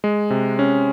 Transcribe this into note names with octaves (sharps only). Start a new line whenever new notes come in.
G#3
C3
C#4